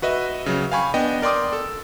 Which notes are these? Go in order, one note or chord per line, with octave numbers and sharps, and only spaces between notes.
F#4 B4 D#5 E5
C#3 F#3
F5 G5 G#5 B5 C#6
B3 D4 D#5 G5
A#4 D5 G5 C6 D6 D#6
A4